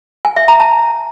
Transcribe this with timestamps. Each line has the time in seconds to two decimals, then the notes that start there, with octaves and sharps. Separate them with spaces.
0.25 G#5
0.36 E5
0.48 A#5
0.60 A5